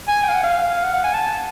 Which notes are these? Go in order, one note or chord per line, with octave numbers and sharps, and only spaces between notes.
G#5
G5
F5
F#5
F5
F#5
F#5
G#5
A5